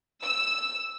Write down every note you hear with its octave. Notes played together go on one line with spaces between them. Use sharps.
E6